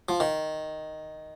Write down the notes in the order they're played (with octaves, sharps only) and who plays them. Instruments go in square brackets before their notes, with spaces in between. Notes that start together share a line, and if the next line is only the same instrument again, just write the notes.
[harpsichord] F3
D#3